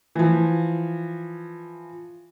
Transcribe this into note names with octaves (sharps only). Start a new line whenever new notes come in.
E3 F3